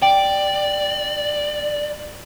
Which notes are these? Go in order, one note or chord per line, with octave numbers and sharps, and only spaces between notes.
D5 G5